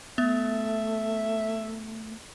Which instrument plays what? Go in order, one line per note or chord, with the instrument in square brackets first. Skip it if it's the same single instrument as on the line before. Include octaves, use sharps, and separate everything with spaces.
[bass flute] A3 [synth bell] B3 [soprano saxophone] E5